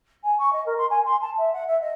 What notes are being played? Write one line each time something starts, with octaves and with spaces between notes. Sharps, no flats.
G#5
C#6
D#5
A#4
C6
G#5
C6
A5
E5
F#5
E5
D#5